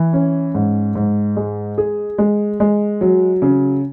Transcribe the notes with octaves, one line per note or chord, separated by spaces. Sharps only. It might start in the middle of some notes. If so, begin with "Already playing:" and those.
Already playing: E3
C#4
G#2
G#2
G#3
G#4
G#3
G#3
F#3
C#3